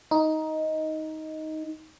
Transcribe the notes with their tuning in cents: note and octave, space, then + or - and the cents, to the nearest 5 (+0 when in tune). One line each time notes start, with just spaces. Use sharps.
D#4 +10